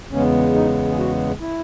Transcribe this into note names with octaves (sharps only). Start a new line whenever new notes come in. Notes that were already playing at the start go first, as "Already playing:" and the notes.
E2 C#3 G#3 B3 C#4
D#4
G#4
F#4
E4